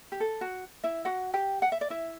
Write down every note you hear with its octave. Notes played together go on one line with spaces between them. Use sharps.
G4
A4
F#4
E4 E5
F#4 F#5
G4 G5
F#5
E5
D5
E4 E5